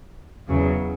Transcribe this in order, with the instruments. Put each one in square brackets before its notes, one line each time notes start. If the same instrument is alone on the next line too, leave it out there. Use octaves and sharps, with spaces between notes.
[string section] E2 C#3 F#3